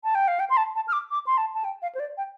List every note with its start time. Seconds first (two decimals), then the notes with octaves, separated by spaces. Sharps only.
0.04 A5
0.15 G5
0.28 F5
0.39 G5
0.50 C6
0.57 A5
0.75 A5
0.88 F6
0.93 D6
1.11 D6
1.26 C6
1.37 A5
1.54 A5
1.64 G5
1.82 F5
1.95 C5
1.99 D5
2.17 G5